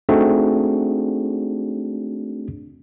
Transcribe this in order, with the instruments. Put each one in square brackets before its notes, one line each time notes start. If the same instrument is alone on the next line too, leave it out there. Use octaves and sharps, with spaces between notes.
[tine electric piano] A3 C4 D4 D#4 F#4 G#4